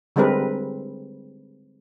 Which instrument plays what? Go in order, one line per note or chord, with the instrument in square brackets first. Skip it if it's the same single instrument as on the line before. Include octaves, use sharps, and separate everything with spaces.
[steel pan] D3 G3 G#3 C4 A#4 B4